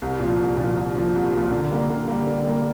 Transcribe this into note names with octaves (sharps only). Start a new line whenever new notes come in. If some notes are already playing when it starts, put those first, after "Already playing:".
C2
A#2 F3
C2
A#2 F3
C2
A#2 F3
C2
A#2 F3
D3
G3 A#3
D3
G3 A#3
D3
G3 A#3